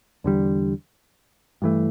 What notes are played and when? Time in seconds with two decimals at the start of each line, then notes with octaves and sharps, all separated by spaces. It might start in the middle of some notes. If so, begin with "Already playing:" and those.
0.24 E2 D3 G3
1.62 G2 E3 A3